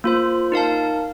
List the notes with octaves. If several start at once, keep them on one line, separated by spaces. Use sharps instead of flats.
A#3 F4 C5
D#4 A#4 F5 A5